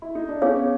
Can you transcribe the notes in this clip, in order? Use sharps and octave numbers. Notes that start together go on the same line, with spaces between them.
E4
D#4
D4
B3 C#4 D#4 G#4 C#5 F5